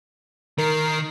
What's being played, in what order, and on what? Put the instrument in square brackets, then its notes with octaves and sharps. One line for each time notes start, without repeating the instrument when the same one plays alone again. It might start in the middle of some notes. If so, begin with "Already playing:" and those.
[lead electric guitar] D#3 [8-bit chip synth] A#4 C7